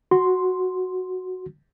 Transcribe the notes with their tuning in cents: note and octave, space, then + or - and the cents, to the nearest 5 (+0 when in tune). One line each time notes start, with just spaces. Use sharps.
F#4 +0 C6 +0